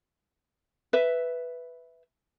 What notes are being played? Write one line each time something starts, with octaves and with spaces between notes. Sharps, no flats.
B4 E5